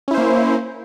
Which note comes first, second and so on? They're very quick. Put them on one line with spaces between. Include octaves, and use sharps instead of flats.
C#4 E4 C5 A#3